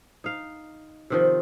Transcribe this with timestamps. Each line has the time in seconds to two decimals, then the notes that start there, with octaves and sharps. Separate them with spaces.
0.24 D#4 F5
1.10 C3 D#3 F3